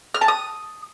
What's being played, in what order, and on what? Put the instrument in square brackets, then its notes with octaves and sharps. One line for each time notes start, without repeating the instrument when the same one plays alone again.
[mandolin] F6
A5
D#6